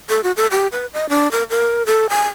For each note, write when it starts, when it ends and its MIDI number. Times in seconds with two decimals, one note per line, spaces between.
0.09 0.21 69
0.24 0.32 66
0.37 0.46 69
0.51 0.67 67
0.72 0.86 71
0.94 1.09 75
1.09 1.31 62
1.31 1.43 70
1.50 1.83 70
1.87 2.06 69
2.10 2.26 80